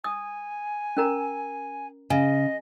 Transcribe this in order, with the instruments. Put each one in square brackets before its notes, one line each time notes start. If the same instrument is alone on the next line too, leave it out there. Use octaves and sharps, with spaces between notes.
[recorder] G#5 [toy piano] D#6
[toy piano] C#4 A#4 A#5
[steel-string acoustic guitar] C#3 [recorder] D#5 [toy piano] G#5